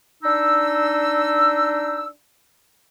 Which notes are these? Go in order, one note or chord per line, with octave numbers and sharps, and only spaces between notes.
D4 D#4 E6